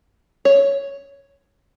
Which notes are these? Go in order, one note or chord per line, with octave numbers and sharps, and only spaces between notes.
C#5